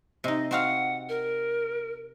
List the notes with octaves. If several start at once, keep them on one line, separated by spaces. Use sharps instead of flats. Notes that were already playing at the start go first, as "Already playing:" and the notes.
C3 D#4 D#5
C4 F#4 F5 F#5
A#4